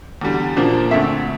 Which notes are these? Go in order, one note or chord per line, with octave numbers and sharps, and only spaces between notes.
E2 D3 G3
A#2 F3 A#3 D4
D2 D3 A3 C4 E5